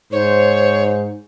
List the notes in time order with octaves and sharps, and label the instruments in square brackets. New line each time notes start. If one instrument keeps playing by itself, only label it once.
[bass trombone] G#2 [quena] C5 [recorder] C#5